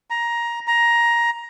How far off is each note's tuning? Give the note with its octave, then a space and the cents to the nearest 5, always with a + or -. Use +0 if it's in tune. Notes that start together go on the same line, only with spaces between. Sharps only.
A#5 +15
A#5 +15